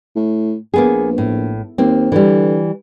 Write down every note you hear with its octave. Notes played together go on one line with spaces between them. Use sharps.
A2
A#1 A#3 B3 G#4
A2
D#2 A#3 C4
D3 E3 G3